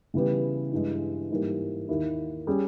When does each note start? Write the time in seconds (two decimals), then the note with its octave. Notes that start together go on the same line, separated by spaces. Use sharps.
0.14 C#3 E3 G3 B3 G4
0.72 G2 E3 G#3
1.31 G#2 E3 G3 A#3
1.89 D#2 D#3 A#3 E4
2.47 G3 C#4 G#4